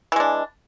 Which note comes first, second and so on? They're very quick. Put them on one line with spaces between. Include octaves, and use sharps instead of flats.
E3 G#3 D4